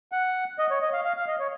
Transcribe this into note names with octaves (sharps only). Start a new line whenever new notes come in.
F#5
D#5
C#5
D#5
F5
F5
F5
D#5
C#5